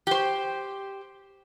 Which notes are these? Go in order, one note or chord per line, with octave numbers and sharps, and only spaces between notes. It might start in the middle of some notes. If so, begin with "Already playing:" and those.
G4 C5